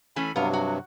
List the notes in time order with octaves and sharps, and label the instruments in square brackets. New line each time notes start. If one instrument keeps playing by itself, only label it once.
[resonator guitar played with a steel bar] E3 A3 C#4 [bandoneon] G#5 B5
[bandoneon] G2 C3 F#3 [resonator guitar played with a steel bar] B3 F5
[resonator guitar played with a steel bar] F#4